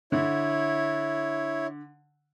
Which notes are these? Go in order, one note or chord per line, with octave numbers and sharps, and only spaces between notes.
D3 E4 C#5